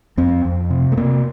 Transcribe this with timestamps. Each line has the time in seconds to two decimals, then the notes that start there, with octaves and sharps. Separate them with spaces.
0.17 F2 C4
0.45 F2
0.70 C3
0.92 A3
0.97 C3 A#3